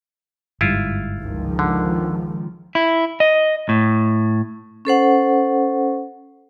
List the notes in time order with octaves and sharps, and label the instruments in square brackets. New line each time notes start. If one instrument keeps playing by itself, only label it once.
[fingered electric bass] G1 G#2 G3 [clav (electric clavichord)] E4 F4
[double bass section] C#2 D#3 F3
[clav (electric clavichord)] D3
[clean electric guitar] E4
D#5
A2
[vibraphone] C#4 A4 C5 F#5